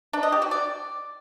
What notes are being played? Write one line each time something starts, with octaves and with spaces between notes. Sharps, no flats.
D4
D#5
G4
F#4
D5